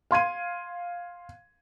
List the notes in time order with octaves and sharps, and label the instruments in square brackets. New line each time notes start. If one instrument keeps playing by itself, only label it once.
[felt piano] F5 C6 G#6 D#7